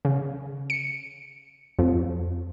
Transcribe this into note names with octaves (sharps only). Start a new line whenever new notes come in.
C#3
C#7
F2